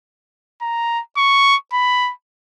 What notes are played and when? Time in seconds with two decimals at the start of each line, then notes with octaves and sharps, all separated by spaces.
0.62 A#5
1.17 C#6
1.73 B5